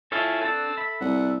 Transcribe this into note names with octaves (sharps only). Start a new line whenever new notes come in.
E4 F4 A4 C#5 E5 F5 G#5
C4 D4 A4 F#5
E5 B5
C2 F#5